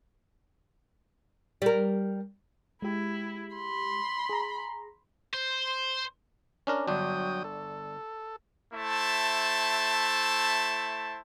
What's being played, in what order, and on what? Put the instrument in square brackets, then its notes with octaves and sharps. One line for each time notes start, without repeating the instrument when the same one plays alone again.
[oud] G3 A#4
[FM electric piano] G#3 G4 [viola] E4
[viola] B5 C6
[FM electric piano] G#4 A#5
[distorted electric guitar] C5
[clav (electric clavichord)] C#4 D4 A#4
[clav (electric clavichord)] G1 D4 [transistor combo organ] F#3 G5 D#6
[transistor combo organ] A4
[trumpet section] A3 E4 C5 A5